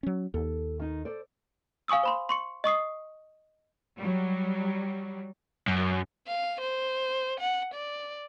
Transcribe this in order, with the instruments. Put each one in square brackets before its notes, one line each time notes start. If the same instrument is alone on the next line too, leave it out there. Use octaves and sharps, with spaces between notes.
[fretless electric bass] F#3 C#4
[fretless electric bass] D#2 [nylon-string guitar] A4
[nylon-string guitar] D#3 D#4
A4 C5 D5
[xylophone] F5 G#5 C#6 D#6 E6
C5 B5 C6
C6 C#6 C#7
D#5 C#6 D#6 C7
[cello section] F#3 G3
[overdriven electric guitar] F#2
[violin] F5
C5
F#5
D5